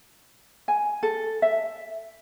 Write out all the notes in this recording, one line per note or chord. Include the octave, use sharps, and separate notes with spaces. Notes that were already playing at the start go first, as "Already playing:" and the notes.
G#5
A4
E5